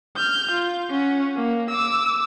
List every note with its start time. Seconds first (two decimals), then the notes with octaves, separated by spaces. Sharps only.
0.17 F6 G6
0.51 F4
0.90 C#4 F#5
1.37 A#3
1.71 D6 E6